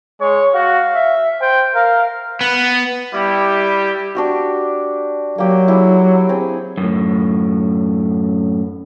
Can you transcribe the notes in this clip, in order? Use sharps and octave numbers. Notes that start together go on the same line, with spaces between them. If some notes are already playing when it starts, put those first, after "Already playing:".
G#3 C#5
F#4 F5
E5
C5 G5
A#4 F5
B3
G3 E4 G4
D4 F#4 G4
F#3 A#3 G4
E4 G4 G#4
C4 G#4
F#2 A2